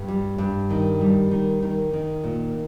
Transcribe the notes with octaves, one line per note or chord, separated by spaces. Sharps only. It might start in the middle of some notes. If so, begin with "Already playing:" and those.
Already playing: G2
G3
G2
D#3
G3
D#3
D#3
D#3
A#2